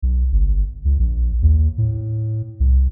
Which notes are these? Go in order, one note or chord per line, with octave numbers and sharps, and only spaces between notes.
B1
G1
C#2
A#1
D#2
A2
C2